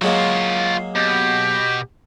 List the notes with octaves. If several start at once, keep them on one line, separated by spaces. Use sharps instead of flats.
F#3 G#3 A#3 F4 C#5
B2 G4